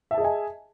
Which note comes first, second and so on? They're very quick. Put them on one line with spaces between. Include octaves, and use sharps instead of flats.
E5 A5 G#4 D#5 G#5